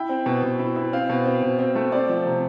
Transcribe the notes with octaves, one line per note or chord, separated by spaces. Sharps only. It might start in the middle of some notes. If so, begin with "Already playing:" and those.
Already playing: E4 G5
C4
B2
B2
E4
E4
C4 F5
B2
C4
B2
C4
A3
C4 D5
F3
C3